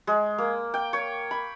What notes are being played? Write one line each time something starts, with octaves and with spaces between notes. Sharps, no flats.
G#3
A#3
G5
C#5
B5